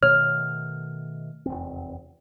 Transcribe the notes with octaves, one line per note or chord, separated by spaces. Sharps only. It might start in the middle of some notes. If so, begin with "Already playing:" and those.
B2 D#3 A3 C#5 F6
F1 E2 C4